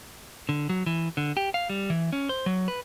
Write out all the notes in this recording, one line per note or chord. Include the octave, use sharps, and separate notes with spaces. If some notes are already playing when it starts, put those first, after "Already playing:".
D3
F#3
E3
D3
G4
F5
G3
E3
C#4
C5
F#3
B4